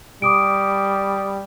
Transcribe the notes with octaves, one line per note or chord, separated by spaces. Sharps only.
G3 D6 D#6 D7